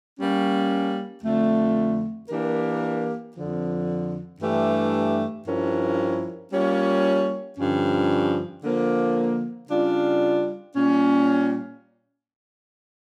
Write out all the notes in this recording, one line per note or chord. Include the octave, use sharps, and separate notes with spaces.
G3 A#3 C#4
F2 D3 A3
E3 A#3 D4 G4 A#4
F2 D3 F3
G2 E3 A3 D4 G4
G2 F3 C#4 E4 A#4
G3 A#3 C#4 F4 C#5
G2 D3 F3 C#4
D3 F3 A#3
C#3 G3 D4 F4
A#2 G3 C#4